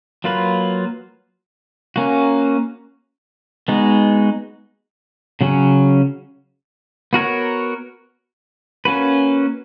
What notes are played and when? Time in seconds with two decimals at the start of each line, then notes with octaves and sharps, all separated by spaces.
0.24 F#3 A#3 F4 B4
1.96 A#3 C#4 F#4
3.68 G#3 B3 D#4 F#4
5.41 C#3 F#3 C#4
7.13 B3 F#4 A#4 C#5
8.85 A#3 C#4 F#4 B4